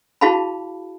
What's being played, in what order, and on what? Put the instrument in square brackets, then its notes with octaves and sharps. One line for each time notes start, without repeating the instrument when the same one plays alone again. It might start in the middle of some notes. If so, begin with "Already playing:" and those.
[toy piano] E4 F#4 G#4 F5 A5 B5